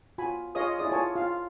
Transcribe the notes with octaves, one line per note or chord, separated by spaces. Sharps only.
F4 F#4 G#5 B5
F4 G#4 C#5 D#5 F5 D#6
E4 G#4 D5 D#6
F4 G#4 C#5 D5 G#5 A5
F4 F5